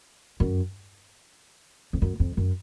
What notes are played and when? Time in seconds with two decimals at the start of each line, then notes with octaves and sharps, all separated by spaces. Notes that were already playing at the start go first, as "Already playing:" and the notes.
0.40 F#2
1.93 F2
2.02 F#2
2.20 F2
2.37 F#2